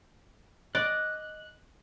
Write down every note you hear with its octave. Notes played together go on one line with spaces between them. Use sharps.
D5 D#5 F#6